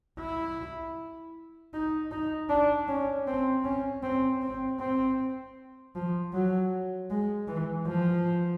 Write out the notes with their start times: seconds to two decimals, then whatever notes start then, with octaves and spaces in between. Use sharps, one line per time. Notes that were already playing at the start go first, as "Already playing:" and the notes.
0.20 E4
1.74 D#4
2.12 D#4
2.50 D4
2.89 C#4
3.27 C4
3.65 C#4
4.03 C4
4.42 C4
4.80 C4
5.96 F3
6.33 F#3
7.10 G#3
7.48 E3
7.87 F3